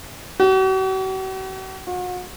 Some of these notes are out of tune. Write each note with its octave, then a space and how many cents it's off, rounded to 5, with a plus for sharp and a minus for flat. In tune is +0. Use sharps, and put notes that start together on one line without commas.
F#4 +45
F#4 -40